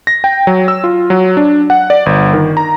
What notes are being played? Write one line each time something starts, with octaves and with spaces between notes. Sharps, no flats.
A#6
G5
F#3
E6
F4
F#3
D4
F#5
D5
G1
D#3
A#5